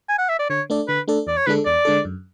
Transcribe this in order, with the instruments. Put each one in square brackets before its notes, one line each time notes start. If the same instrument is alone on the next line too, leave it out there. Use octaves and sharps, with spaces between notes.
[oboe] G#5
F#5
E5
D5
[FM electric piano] D3 [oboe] C#5
[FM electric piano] A3 D4 A4 D5
[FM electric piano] D3 [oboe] B4
[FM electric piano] A3 D4 A4 D5
[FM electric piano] E2 [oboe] D5
[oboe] C#5
[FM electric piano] D3 G#3 D4 A4 [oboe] B4
[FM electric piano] E2 [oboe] D5
[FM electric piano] D3 G#3 D4 A4
F#2